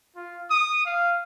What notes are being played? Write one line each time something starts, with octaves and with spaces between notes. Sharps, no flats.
F4
D#6
F5